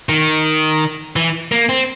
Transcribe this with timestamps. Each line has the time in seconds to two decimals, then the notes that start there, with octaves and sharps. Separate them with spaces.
0.09 D#3
1.16 E3
1.52 A#3
1.69 C4